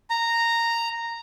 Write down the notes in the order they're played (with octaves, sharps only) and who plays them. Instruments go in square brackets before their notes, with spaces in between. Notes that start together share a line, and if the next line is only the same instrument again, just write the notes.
[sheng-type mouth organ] A#5